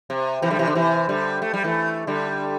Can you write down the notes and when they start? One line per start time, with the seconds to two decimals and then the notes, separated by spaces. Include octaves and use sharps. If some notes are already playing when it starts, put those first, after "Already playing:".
0.10 C3
0.42 C3 E3
0.50 D3 G3
0.59 C3 E3
0.67 D3
0.75 C3 E3
1.09 D3 G3
1.42 A3
1.54 G3
1.64 E3 A3
2.07 D3 G3